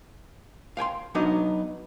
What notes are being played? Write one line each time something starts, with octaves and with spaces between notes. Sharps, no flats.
F5 G5 G#5 C6
F#3 B3 D4 D#4 D#5